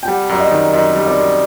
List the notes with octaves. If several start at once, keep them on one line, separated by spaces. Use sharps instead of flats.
G5
G3 F#5
F#2 D5
D#5
D#3
F#2 D#5
G3
D5
F#2